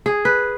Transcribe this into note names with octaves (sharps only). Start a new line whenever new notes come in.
G#4
B4